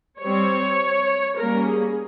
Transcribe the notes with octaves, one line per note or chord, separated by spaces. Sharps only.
G3 C4 C#5
G3 A#3 C#4 A#4
G#4